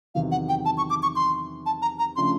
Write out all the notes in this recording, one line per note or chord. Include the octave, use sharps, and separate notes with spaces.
E2 C3 D#3 F#3 F5
F#5
G5
A5
C#6
D6
C#6
C6
A5
A#5
A#5
C#3 F3 A3 D4 C6